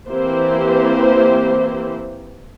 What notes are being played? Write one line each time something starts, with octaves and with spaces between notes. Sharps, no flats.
E3 A#3 C4 E4 G4 C5